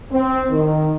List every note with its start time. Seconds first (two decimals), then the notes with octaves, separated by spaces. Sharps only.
0.12 C4
0.50 D#3